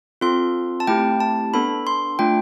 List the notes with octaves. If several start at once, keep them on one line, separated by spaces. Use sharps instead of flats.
C4 F4 A4 C6
A5
A3 C4 E4 G4 G5
A5
B3 D4 A4 B5
C6
A3 D4 F4 G5